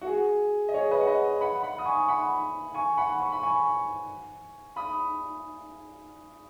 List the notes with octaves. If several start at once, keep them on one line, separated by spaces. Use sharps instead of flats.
F#4
G#4
D#5
G#4 C#5
B4 D#5
F#5
B4 D#5
F#5 B5
F#5 B5
D#6
G#5 C#6
F#5 B5
G#5 C#6
F#5 B5
C#6
B5
G#5 C#6
B5 D#6